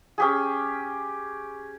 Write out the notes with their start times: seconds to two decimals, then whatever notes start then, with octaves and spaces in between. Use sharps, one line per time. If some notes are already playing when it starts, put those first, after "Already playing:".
0.18 C#4 G4 G#4